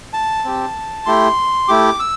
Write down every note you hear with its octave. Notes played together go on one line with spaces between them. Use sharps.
A5
C4 G4
A3 E4 G4 C6
A3 E4 G4 D6
E6